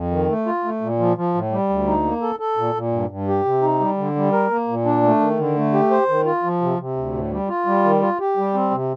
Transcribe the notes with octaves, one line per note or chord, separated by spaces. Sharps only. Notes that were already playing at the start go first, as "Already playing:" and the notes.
Already playing: F2
D#3
A3
F4
A3
A#2
F3
F3
A2
G3
D2
D#4
A#3
A4
A4
A#2
A#2
G2
G2
G4
C3
D#4
G3
D3
G3
A#4
A#3
A#2
D4
A3
D#3
D3
A3
G4
C5
D#3
F4
F3
C3
C3
D2
A2
G3
F4
G3
D#3
F4
G4
G3
C4
C3